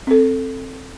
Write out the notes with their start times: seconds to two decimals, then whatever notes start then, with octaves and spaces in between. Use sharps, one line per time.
0.07 C4 A4